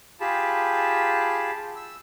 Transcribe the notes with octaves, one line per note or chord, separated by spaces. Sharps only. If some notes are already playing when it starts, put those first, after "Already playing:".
F4 G4 G#4 A5 B5
E6